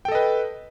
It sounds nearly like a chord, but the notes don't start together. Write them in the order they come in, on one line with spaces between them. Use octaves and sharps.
G5 A4 D#5 B4